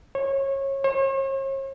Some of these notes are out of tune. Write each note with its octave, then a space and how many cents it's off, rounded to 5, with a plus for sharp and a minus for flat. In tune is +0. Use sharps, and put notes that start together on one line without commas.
C#5 -25
C#5 -45